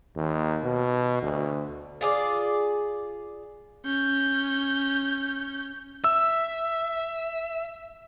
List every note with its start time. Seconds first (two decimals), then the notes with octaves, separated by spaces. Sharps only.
0.16 D#2
0.64 B2
1.23 D2
2.01 F4 G#4 D5
3.85 C#4 G6
6.04 E5 E6